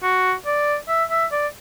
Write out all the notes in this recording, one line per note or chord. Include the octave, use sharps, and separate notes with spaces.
F#4
D5
E5
E5
D5